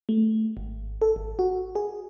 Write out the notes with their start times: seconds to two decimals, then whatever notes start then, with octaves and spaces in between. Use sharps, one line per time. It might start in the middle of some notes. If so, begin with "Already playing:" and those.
0.09 A3
0.57 G#1
1.02 A4
1.16 G#1
1.39 F#4
1.75 G#4